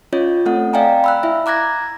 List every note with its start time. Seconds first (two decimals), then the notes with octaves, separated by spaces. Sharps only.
0.13 C#4 F4 C#5 D#5
0.46 A3 C4 A4 F#5
0.73 D5 D#5 F5 G5 G#5 A#5
1.04 B5 E6 F#6
1.23 E4 E5
1.46 A#5 D6 F#6 G#6 A#6